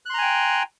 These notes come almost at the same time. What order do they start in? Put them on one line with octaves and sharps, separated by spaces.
F#6 C6 A#5 G#5 G5